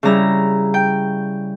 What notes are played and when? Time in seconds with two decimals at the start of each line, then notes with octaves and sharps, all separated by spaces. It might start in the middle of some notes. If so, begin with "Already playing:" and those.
0.03 C#3 G3 C#4 E4 A#5
0.74 G5